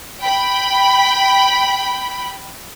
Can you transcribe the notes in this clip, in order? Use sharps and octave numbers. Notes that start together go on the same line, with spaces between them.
G5 B5